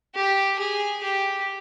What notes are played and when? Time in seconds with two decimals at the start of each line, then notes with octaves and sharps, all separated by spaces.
0.15 G4
0.59 G#4
1.03 G4